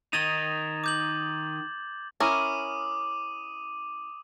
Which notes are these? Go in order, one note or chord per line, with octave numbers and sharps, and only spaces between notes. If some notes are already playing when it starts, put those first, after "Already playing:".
D#3 D#4 G#6 A6 E7
D6 G6 F#7
C#4 E4 A#4 D6 D#6 D#7